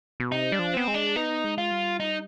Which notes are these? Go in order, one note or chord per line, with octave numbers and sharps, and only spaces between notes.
B2
C3 D#4
G3 D4
F3
B3 C4
G#3
D4
B3 D#4
G#3
F4
G3
D#4